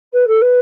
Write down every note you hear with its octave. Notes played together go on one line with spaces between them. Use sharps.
B4
A4
B4